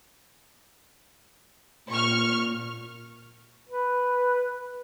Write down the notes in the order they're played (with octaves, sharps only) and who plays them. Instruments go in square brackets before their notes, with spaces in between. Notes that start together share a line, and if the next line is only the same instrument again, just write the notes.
[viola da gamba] A#2 [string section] C#6 F6
[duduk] B4